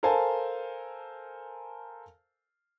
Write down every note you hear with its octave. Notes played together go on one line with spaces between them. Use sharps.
A4 A#4 C5 F5 G#5 A5